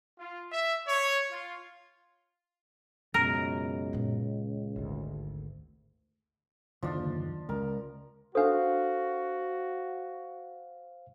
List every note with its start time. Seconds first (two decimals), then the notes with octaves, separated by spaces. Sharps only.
0.19 F4
0.52 E5
0.87 C#5
1.32 F4
3.14 C#2 F#2 B2 A#4
3.93 A#2 G#3
4.76 G#1 D2
6.82 F#1 D#2 D3 F3 D4
7.49 C#2 A#4
8.35 D4 F#4 A4 C5 F5